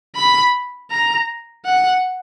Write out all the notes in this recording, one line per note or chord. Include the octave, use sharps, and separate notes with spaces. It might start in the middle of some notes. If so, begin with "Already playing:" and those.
B5
A#5
F#5